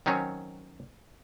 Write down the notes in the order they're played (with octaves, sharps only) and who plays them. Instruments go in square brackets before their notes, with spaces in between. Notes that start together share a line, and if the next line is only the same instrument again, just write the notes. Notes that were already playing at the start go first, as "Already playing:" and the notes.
[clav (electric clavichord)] D#3 F#3 C4 C#4 C#5